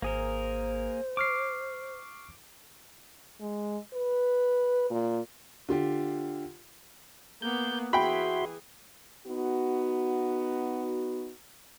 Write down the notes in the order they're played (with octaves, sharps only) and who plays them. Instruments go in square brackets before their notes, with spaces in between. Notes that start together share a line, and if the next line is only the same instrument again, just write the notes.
[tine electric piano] G#1 [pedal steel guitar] A#3 G#4 A#4 [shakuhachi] C5
[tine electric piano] C#6 F6 C7 [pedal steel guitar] D6
[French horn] G#3
B4
A#2
[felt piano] D3 F4 G4
[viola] A#3 B3 [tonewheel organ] G6
[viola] E3 G#4 [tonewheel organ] F#4 E5 C6 [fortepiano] G5 B5
[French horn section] B3 D#4 F#4